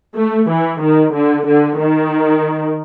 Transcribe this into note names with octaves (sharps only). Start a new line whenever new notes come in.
A3
E3
D#3
D3
D3
D#3